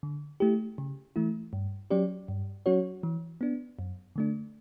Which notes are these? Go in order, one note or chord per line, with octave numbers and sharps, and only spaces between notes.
D3
A3 E4 G4
C#3
E3 A3 E4
G2
F#3 C#4 G4 D5
G2
F#3 C#4 F#4 C#5
E3
B3 D4
F#2
D3 A3 D4